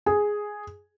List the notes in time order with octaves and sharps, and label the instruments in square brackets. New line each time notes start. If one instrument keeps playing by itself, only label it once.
[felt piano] G#4